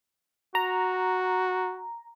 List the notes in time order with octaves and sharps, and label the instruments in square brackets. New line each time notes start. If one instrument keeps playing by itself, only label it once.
[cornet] F#4 [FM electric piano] A#5